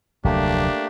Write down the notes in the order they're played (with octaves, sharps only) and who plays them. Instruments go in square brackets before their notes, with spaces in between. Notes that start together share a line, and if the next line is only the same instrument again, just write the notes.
[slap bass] F1 D2 F#3 [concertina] A3 A#3 G4 [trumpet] D4